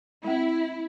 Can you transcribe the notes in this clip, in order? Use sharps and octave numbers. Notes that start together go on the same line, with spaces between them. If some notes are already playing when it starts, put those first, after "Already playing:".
G#3 C4 E4